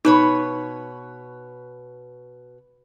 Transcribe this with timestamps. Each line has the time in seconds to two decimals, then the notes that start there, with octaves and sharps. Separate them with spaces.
0.05 B2 D#4 B4 C#5